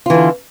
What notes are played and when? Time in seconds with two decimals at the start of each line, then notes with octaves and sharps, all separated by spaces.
0.06 F4
0.10 E3
0.14 D3